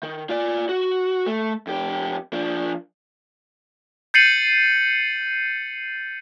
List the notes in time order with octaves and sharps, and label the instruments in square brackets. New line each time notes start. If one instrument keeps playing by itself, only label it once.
[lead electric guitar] D#3
F4 D5
F#4
A3
F2 G4
F3 D4
[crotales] G6 A6 C7 C#7 D#7 F#7